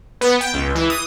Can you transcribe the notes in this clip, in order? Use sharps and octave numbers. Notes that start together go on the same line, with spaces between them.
B3
G5
C#2
E3
D#6